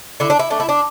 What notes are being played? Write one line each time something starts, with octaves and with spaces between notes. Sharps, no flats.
D3 E4
D4
E4
A3 D4
E4
D4